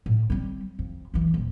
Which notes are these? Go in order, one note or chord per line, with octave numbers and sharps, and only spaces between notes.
A2
G3 C4
F2
C#2 E3
D#1